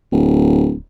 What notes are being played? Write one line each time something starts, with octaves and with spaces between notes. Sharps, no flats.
D1